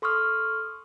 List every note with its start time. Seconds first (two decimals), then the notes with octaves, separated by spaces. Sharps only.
0.02 A4 C6 C#6 D#6 F6